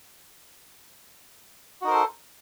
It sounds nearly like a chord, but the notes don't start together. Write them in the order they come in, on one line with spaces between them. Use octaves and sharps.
F#4 D#4 A#4 C5 A4